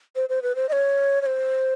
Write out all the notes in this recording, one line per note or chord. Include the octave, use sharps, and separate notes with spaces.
C5
C5
B4
C5
D#5
C#5
C#5
C5